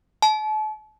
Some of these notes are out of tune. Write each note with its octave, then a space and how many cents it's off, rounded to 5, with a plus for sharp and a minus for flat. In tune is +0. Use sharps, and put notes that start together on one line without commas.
A5 -40